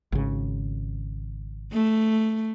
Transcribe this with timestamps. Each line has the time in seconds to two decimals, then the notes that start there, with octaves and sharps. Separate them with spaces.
0.12 G#1 C#3
1.72 A3